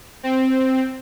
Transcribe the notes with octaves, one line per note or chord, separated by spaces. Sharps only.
C4